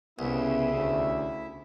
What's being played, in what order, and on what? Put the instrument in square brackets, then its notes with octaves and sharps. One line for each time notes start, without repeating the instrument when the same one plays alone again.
[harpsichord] C2 [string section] C#3 [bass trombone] B3 [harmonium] E4 E5
[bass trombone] D2